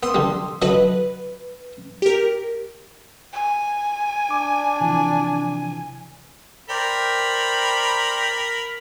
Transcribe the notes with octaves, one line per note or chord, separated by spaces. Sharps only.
B3 C6 D#6 E6
D3 G3
D3 F#3 B4 D#5
G4 A#4
G#5
D4 D6
C3 E3 F3
A#4 C5 D5 G5 B5